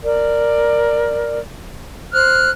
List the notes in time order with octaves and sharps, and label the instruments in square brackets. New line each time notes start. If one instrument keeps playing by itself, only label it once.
[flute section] A#4 D5
C5 F6 F#6